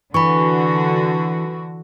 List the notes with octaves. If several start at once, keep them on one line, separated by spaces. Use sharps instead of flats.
D3 E3 F#4 B5 C#6